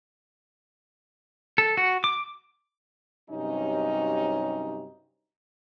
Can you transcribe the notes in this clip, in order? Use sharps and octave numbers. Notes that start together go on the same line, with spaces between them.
A4
F#4
D6
G2 C3 F#3 C#4 D#4